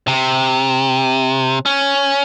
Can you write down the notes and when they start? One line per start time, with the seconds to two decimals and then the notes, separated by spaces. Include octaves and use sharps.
0.08 C3
1.66 C#4